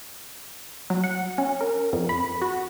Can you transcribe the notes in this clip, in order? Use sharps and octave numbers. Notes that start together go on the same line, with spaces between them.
F#3
F#5
C#4
A#4
F2
B5
F#4